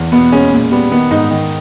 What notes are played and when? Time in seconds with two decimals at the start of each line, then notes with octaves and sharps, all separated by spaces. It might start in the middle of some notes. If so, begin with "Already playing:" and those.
Already playing: E2
0.12 B2 B3
0.32 G#3 C#4
0.52 A#2
0.72 G3 B3
0.91 D#3 B3
1.11 G#2 D#4
1.31 D#3